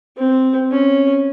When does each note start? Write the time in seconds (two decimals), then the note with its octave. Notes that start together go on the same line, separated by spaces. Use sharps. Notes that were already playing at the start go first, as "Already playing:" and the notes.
0.17 C4
0.71 C#4